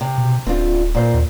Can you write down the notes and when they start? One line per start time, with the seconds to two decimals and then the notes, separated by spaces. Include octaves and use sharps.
0.01 C3
0.18 B2
0.47 D1 C4 D4 F4
0.95 A#2 C5
1.14 D#2